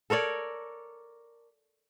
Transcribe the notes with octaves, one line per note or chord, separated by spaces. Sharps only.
A4 A#4 C#5 D5